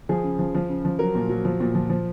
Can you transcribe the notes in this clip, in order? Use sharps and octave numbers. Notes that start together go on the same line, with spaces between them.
F3 G#4
C#3
F3
F3
C#3
F3
F#3 A#4
A#2
F#3
F3
A#2
F3
F3